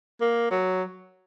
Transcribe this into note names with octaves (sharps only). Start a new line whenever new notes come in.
A#3
F#3